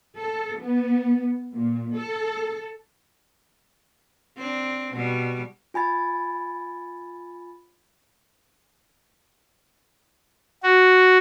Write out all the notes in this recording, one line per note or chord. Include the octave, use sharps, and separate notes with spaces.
A4
B3
A#2
A4
C4 D4
B2 G3
F4 G#5 B5 A6
F#4